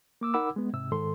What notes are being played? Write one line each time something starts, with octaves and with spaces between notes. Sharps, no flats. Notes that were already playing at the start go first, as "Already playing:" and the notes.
A#3 D6 E6
D#4 A#4 F#5 B5 D6 E6
G#3 B3
G#2 C3 E6
G#2 D#3 A4 C6